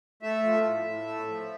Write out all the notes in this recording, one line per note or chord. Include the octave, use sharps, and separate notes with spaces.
A3 E5
F3
A2
A2
A3
F3